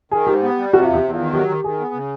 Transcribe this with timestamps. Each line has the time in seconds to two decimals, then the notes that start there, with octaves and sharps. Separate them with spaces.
0.11 D#3 G#4
0.27 G#2 G4
0.42 B3
0.58 G3
0.73 C3 F#4
0.83 F4
0.87 E2
0.94 G4
1.03 E2
1.14 F4
1.18 D#3
1.33 F#3 G4
1.48 D#3
1.64 D#3 G#4
1.79 B3
1.94 C#3